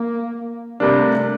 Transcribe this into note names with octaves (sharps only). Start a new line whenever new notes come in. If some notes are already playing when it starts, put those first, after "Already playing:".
Already playing: A#3
C3 G3 A3 A#3 D4